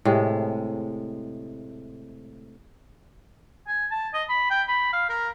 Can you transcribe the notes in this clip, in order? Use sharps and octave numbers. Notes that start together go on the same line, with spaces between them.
A2 C3 G#3
G#5
A5
D#5
B5
G5
B5
F5
A#4